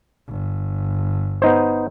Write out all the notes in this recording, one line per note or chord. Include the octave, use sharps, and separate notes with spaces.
G1
B3 D#4 C5